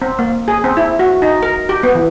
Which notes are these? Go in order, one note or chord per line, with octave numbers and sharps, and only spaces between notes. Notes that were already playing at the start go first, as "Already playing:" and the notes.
C4
A#3
G#4
C4
E4
F#4
D#4
A#4
G4
B3
E3